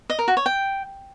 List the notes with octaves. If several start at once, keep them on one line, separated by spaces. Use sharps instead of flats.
D#5
A#4
F#4
C#5
G5